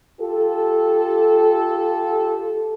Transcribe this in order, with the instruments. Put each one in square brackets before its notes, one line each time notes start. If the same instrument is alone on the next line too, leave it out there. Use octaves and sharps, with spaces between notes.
[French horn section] F4 G4 A4